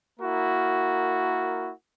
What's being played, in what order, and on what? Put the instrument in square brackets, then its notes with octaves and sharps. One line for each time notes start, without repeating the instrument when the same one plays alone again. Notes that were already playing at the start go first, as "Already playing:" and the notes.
[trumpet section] A#3 E4 F#4 A#4